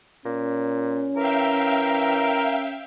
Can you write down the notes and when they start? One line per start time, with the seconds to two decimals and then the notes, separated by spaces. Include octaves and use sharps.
0.26 A#2 C#4
1.17 E3 A#4 E5 F5 G5